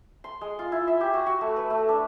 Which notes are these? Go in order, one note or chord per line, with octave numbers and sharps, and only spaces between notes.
C6
G#3
F4
E4
E5
G4
F#4
F#4
A3
B4
A3
D4